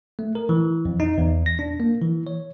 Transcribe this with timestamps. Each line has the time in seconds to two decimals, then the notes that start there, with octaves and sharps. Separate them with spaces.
0.19 A3
0.35 A#4
0.49 E3
0.85 F2
1.00 D#4
1.18 E2
1.46 A#6
1.59 D4
1.80 A#3
2.02 E3
2.27 C#5